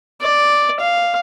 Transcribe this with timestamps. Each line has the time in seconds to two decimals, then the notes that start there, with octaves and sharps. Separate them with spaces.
0.21 D5
0.80 F5